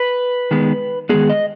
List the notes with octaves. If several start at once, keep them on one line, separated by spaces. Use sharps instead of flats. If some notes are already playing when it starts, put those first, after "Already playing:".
Already playing: B4
D#3 G#3 B3
D#3 G#3 B3 G#4
D#5